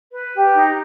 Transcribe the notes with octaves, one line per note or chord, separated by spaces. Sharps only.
B4
G4
D#4